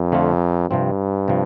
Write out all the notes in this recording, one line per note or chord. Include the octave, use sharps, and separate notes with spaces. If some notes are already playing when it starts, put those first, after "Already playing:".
Already playing: F2
D3 A3 C4 F4
G2 C3 F3 C4
C3 F3